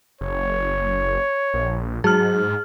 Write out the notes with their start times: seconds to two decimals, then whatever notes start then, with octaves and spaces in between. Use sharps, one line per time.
0.21 F#1 C#5
1.54 A#1
2.04 G#2 F#3 G#4 F6